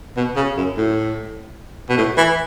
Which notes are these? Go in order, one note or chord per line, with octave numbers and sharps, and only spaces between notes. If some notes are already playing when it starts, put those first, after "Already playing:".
B2
C#3
F#2
A2
B2
A2
E3